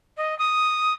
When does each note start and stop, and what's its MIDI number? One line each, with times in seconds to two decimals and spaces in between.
0.17 0.36 75
0.38 0.92 87